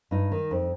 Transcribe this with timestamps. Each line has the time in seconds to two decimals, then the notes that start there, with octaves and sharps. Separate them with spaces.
0.11 G2 D#4
0.32 D#3
0.51 F2